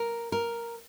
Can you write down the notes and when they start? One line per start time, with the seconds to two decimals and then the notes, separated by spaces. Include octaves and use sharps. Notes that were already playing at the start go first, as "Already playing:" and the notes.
Already playing: A#4
0.32 A#4